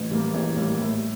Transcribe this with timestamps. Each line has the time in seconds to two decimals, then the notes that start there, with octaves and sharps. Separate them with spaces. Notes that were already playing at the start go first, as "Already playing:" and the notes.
Already playing: A1
0.10 A2 G3 A#3
0.34 A1
0.56 A2 G3 A#3
0.79 A2